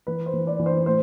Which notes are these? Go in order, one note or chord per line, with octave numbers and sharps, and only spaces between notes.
E3 B4
C5
E3
D5
E3
C5
A2 C5